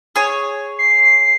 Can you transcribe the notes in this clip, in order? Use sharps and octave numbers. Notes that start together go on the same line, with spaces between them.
G#4 C#5
C7